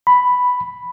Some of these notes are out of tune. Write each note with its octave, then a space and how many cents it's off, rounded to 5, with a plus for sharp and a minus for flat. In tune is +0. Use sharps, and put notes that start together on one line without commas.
B5 +5